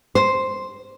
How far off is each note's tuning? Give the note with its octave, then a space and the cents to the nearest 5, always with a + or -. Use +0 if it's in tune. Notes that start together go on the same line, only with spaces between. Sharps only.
C5 +0